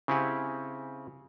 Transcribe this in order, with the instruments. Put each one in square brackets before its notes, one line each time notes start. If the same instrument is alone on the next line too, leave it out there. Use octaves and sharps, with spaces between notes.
[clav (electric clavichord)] C#3 C4 E4 G4 F#5 G#5